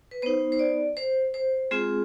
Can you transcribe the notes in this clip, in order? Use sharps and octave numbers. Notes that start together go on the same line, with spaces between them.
B4
B3 D#4 C5
C5
D5
C5
C5
G#3 C4 F4 G#4